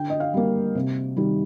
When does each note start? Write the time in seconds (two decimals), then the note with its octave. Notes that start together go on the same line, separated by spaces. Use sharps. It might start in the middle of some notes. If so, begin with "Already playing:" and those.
Already playing: D3 G5
0.10 D#5
0.20 F5
0.34 G3 A#3
0.75 C3
1.17 D#3 G3